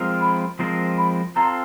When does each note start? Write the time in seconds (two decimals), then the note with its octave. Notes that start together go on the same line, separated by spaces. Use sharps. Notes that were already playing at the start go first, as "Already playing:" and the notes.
Already playing: F3 G#3 C4 F4 A#4
0.21 B5
0.59 F3 G#3 C4 F4 A#4
0.98 B5
1.36 C4 F4 A4 A#5